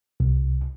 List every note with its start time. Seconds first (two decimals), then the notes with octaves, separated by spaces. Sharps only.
0.20 C2